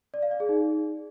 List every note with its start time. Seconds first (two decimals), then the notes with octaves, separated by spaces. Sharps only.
0.14 D5
0.22 F5
0.31 D5
0.40 G#4
0.49 D#4